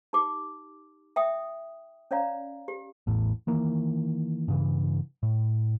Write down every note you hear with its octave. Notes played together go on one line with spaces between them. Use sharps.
D#4 G4 D6
E5 G5 D#6
C#4 C#5 D5 F5 A#5
G4
A1 E2 A2
D#3 E3 A#3
G2 C#3 E3
A2